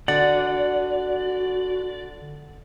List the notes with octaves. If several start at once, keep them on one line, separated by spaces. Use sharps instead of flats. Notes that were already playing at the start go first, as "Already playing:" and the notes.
D3 F#4 D5 F#5